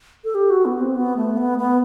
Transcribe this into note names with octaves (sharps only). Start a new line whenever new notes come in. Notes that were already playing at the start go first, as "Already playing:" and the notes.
A4
G4
F#4
B3
C4
B3
A3
B3
B3